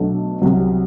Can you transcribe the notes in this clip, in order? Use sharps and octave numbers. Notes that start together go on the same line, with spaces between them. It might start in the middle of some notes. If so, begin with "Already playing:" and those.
Already playing: B1 B2 F#3 A3 D4
C2 C3 F#3